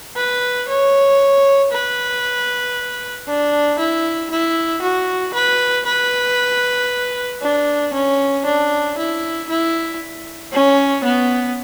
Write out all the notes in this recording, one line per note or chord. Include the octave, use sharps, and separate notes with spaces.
B4
C#5
B4
D4
E4
E4
F#4
B4
B4
D4
C#4
D4
E4
E4
C#4
B3